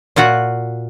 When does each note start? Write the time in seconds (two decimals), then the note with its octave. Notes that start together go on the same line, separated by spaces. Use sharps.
0.16 A#2 F4 F#4 F#5